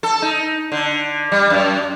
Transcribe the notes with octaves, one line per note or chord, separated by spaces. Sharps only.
A4
D#4
D3
G3
F#2